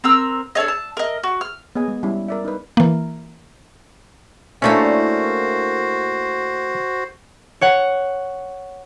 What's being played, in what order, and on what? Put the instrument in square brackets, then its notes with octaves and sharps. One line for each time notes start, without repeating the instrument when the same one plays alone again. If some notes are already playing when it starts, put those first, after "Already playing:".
[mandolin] C4 A#4 E6
D4 A4 C#5 D#5
A5
A#4 D#5
F#4
F6
[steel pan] B3 G#4 D#5 G#5
G#3
G3 C#4 E4
A#4 D5 E5
D#4 B4
[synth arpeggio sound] E3 A#3
[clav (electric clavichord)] A3 C#4 [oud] A#3 D4 E4 [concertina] F#4 C5
[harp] C#5 F#5